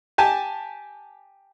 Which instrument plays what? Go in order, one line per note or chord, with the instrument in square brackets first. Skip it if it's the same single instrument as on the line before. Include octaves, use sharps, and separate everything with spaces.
[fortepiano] G4 G#5 A5